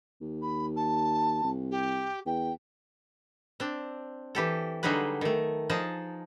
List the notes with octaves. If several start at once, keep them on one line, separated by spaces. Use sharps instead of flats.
D#2
B5
A5
C2
G4
E2 G5
C4 D4
E3 G4 A4
D3 F#3 G3 D#4 G#4 B4
D#3 A3
F3 D#4 G#4 A5